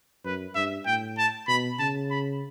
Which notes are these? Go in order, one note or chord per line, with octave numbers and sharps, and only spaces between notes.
F#2 B4
G2 E5
A2 G5
A5
B2 B5
C#3 A5
B5